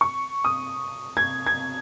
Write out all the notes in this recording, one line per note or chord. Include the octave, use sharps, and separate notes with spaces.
C#6
D#6
G#6
G#6